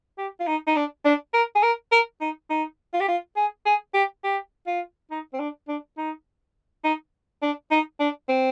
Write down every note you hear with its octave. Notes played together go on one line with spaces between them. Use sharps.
G4
F4
D#4
D#4
D4
D4
A#4
G#4
A#4
A#4
D#4
D#4
F4
G4
F4
G#4
G#4
G4
G4
F4
D#4
C4
D4
D4
D#4
D#4
D4
D#4
D4
C4